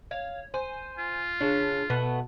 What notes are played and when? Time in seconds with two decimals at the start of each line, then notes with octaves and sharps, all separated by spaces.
0.11 C#5 F5
0.54 C5 G#5
0.99 F4
1.41 C#3 D4
1.90 B2 A3 B3